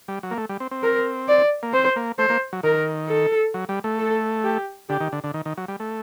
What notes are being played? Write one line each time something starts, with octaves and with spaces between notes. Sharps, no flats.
G3
F#3
A#3
A3
G3
C4
C4
A#4
D5
A#3
C4 C5
A#3
A3 C5
A#3
F#3
D#3 A#4
A4
F#3
G3
A3
A4
G4
D3 G4
D#3
D3
D3
D#3
D#3
F#3
G3
A3